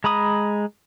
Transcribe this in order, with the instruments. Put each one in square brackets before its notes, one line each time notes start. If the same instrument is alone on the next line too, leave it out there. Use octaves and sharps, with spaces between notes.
[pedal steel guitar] G#3 A#5 B5 D#6